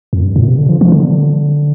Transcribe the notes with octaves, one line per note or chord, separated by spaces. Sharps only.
F2
G2
A#2
C3
D3
F3
F3
D3